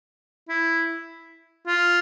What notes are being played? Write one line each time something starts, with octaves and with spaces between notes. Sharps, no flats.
E4
F4